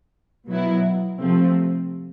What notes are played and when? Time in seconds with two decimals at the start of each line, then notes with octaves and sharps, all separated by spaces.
0.47 B2 F#3 B3 E4
1.20 C3 F3 A3 C4